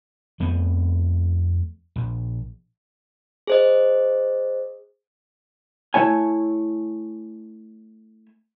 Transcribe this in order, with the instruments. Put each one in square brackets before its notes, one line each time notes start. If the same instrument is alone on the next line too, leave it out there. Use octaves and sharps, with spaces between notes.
[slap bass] F2 F3 A3 B3
A#1
[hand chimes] G#4 C5 D#5
[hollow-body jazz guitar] A3 E4 C#5 G#5